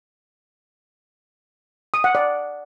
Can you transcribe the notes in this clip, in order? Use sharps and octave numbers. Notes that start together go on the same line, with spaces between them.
D#6
F#5
D5